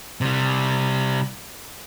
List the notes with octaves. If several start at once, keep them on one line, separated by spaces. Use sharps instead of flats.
C3 G3